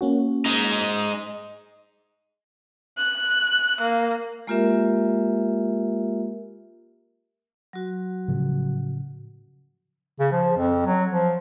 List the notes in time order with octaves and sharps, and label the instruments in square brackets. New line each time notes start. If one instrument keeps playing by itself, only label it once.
[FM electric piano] A#3 C#4 F#4
[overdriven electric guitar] G#3 D#4
[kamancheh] F#6
A#3
[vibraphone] G#3 A#3 F4 G4 A#4 E5
F#3 F#4
[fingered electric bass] A2 C#3 F3
[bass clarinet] C#3
F3
F2
F#3
F3